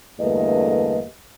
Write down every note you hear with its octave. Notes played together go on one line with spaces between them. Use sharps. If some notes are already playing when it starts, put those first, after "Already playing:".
E2 G2 D3 A3 A#3 D#5